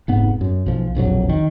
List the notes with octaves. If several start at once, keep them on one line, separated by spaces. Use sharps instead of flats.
F1 G#2 B3
F#2
B1 F3
E1 A#1 F2 F#3
D#3